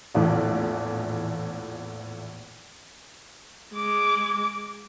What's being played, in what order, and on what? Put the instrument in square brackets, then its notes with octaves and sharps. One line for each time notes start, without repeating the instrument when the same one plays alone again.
[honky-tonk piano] A#1 E2 A2 E3 F3
[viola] G#3 D6